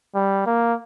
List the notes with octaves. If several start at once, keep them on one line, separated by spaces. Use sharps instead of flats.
G3
A#3